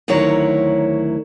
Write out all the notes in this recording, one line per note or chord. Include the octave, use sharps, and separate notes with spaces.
D2 D#3 F#3 E4 A#4 C#5